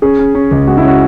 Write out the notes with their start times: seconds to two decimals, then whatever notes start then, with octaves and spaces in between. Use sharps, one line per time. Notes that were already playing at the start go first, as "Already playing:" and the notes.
0.02 C#4 G#4
0.19 C#4
0.35 C#4
0.51 C#2
0.67 G#3 F#4
0.77 E4
0.83 C#4 F#4